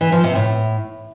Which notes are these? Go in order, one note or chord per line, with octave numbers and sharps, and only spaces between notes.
E3
F3
C3
A2